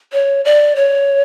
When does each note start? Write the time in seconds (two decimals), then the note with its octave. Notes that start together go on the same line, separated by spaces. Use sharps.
0.12 C#5
0.45 D5
0.76 C#5